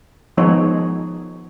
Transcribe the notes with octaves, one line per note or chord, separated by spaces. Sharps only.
D#3 F3 G#3 B3 D#4 C#5